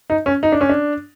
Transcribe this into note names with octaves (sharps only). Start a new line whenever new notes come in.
D#4
C#4
D#4
D4
C#4
D4